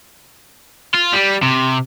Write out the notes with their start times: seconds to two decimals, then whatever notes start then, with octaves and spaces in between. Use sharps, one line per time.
0.95 F4
1.13 G3
1.42 C3